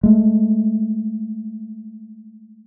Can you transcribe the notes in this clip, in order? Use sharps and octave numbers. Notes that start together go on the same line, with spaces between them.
G#3 A3